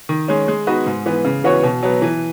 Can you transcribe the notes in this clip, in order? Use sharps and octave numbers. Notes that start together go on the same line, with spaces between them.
D#3
G#3 C#4
G#3
B3 D#4 F#4 B4
G#2
E3 B3
C#3
E3 B3 F#4 C#5
B2
F#3 B3
E3